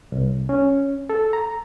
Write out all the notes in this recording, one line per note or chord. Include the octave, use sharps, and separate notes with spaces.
C2
C#4
A4
A#5